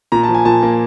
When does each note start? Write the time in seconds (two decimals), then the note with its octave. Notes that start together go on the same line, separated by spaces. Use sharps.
0.12 A#2 A#5
0.23 A5
0.29 F3
0.34 G#5
0.45 A#2 A5
0.63 A#3